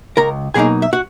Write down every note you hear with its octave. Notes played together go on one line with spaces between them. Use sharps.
C#2 A#4 A#5
B2 F#3 A#3 D#4 G#4 G#5
E5
F#4 F#5